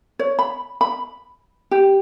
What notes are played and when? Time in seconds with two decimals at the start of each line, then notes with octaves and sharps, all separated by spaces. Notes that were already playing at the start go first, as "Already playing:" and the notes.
0.19 C#5
0.39 B5
0.81 B5
1.71 G4